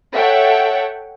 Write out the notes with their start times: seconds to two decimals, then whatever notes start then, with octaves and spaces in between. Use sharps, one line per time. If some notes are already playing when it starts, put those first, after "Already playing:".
0.15 A4 C#5 E5 F#5 G5